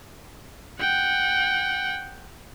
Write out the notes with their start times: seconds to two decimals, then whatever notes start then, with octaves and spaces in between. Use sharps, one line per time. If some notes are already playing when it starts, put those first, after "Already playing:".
0.80 F#5 G5